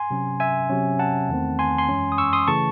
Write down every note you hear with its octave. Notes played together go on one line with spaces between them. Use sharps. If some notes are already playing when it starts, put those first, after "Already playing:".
Already playing: G#5 C6
C3 F#3 C#4
E5 G#5
C3 F#3 C#4
F#5 A5
E2 D#3 A3 C4
G#5 C6
G#5 C6
F#2 E3 G#3 C#4
D#6
C#6 E6
C6 D#6
C#3 E3 A3 A5 C#6